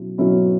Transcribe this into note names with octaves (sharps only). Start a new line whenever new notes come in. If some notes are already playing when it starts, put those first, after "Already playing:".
Already playing: B2 F#3 C#4 E4
B2 F#3 C#4 E4